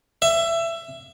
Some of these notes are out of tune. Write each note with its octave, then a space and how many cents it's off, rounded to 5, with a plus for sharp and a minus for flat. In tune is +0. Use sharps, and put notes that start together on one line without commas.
E5 +20